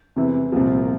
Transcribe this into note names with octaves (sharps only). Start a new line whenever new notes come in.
E2 C3 E3
C2 A#2 F3 G4
F4
A#3